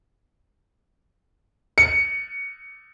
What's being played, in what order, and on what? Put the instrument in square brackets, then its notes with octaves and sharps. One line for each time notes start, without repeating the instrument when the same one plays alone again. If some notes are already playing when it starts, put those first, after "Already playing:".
[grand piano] C#7